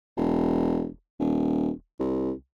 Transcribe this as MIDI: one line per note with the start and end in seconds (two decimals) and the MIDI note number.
0.17 0.88 28
1.20 1.70 27
2.00 2.32 36